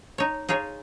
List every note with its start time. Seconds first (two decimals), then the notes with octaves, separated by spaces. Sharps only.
0.18 D#4 C#5
0.49 D#4 F4 G#4 C#5